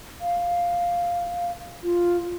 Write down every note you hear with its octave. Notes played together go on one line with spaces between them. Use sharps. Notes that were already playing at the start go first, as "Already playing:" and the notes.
F5
F4